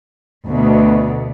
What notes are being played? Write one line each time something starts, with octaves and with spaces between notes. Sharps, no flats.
D2 B2